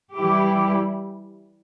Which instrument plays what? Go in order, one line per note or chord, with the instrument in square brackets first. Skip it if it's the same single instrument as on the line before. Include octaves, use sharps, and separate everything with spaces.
[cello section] E3 G3 E4 G4